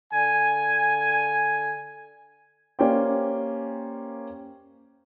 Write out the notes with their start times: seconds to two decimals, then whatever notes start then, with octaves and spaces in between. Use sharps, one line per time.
0.13 D3 G#5
2.79 A#3 C#4 G4 C5 D5 G5